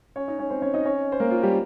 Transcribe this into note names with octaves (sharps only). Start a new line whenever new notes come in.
C#4 C#5
D#4 D#5
C#4 C#5
C4 C5
C#4 C#5
D#4 D#5
C#4 C#5
C5
A#3 A#4
F4
G3 G4